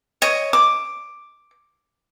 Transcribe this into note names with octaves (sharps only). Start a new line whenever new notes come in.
C#5 D#5
D6